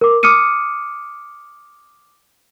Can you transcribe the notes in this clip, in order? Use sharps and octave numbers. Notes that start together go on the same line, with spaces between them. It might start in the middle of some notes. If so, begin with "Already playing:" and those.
A#4 D6
D6 D#6 F6 C#7 D#7